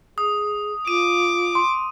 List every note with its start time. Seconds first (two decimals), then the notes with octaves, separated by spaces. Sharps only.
0.18 G#4 D#6
0.87 F4 D6 D#7
1.55 C6